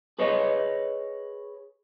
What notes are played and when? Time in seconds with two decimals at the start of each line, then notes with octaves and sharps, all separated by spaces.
0.19 G#4 B4 C#5 D#5